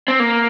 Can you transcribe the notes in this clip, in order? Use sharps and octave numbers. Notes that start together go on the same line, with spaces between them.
C4
A#3